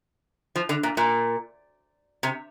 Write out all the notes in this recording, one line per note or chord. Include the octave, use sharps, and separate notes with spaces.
F3
D3
A#2
A#2
C3